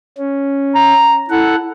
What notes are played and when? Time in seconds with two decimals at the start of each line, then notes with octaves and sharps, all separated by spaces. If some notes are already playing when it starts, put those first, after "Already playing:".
0.18 C#4
0.75 A#5
1.30 E4 A4 F#5